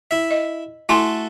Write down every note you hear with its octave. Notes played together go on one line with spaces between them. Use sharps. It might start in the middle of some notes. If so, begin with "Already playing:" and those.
E4 E5
D#5
A3 E4 F#4 A4 G#5 C6